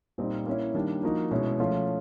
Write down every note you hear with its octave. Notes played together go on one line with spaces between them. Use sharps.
A#2 G3 C4 D#4
A#3 C#4 E4
D#3 G3 A#3 D4
F3 A#3 D#4 F#4 A#4
B2 G#3 C#4 E4
F3 A3 C#4 F4